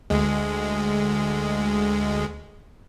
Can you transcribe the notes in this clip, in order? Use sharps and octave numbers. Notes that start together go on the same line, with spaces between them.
D2 G#3